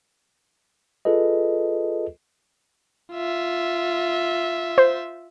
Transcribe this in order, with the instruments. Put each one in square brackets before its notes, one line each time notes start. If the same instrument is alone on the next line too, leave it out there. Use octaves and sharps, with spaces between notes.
[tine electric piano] F4 G#4 A4 B4 D#5
[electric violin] F4 E5
[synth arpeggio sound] C5